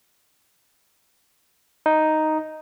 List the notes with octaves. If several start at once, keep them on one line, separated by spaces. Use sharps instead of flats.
D#4